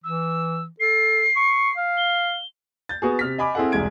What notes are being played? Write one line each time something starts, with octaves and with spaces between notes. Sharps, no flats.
E3 E6
A4 C7
C#6
F5
G7
G6 A6
B3 F#4 G#4
C3 F6 B6
D#5 G#5 B5 D6
C4 E4 G#4 A4 F#5
E1 C2 G#3 G#6 D7